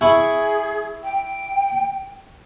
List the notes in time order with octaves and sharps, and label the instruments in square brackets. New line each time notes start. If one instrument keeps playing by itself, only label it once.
[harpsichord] E4 G#5 C#6 [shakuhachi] G#4
[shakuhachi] G5